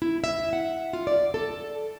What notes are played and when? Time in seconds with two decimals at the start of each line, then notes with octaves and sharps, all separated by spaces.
0.02 E4
0.24 E5
0.53 F#5
0.93 F4
1.07 D5
1.34 A4